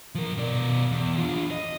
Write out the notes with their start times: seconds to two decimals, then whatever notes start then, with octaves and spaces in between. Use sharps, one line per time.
0.15 F3 A#4
0.37 B2 D5
0.91 E2
1.18 D4 F4
1.51 D#5